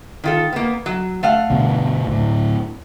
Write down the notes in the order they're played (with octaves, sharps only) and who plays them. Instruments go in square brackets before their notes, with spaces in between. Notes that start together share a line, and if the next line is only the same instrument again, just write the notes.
[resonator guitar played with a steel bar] D#3 F4 A4
A#3 B3
F#3
A3 F5 F#5
[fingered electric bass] G2 B2 D3
D2 A2